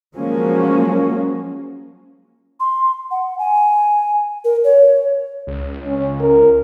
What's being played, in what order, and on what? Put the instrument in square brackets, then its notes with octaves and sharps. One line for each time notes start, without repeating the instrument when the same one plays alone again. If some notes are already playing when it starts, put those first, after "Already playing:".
[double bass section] F3 F#3 G#3 A#3 C#4
[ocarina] C6
F#5
G#5
A#4
C#5
[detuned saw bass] C#2
[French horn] C#4
A#4